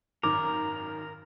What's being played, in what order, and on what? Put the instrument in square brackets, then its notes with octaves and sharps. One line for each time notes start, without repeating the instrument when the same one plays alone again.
[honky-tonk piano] G#1 F#2 D#3 [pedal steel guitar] A#4 [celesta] D6